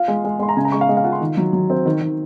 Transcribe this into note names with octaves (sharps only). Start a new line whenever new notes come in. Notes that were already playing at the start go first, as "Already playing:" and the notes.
Already playing: F4 F5
G#3
G#3
G#3 C6
A#5
C#3 G#5
A#5
G#3 C#6
F5
G#3 D#5
F5
F4 F#5
C6
D#3
F#3
F#3
C4
D#3
D#3